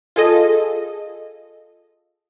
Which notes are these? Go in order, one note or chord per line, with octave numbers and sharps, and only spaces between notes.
F4 G#4 A4 D#5